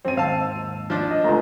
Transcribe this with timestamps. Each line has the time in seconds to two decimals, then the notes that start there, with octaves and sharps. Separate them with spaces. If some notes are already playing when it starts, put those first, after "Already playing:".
0.05 F#2 C4 D#7
0.17 G#1 D#2 F5 A5 E6
0.90 F3 D4
1.10 D#5
1.24 C#2 A3 F4 A#5